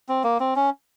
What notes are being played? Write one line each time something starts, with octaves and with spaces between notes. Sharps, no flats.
C4
A#3
C4
C#4